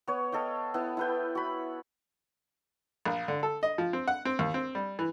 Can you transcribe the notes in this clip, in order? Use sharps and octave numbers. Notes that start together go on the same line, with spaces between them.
B3 C#5
A4 D#5 F5 G5
B3 E4
E4 B4 G5
F#4 B5
A#1
D3
A4
D#5
F3
C4
F#5
C4
D#2
C4
G3
E3